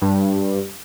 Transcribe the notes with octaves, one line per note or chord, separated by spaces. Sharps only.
G2